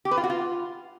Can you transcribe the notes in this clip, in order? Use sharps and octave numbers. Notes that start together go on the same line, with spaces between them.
G4
B4
F4
F#4
F4